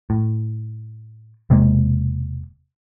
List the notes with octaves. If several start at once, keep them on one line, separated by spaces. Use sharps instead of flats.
A2
E1 C3 G#3 A#3